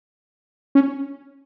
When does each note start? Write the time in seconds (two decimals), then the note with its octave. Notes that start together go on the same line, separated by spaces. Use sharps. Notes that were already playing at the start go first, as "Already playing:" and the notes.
0.75 C#4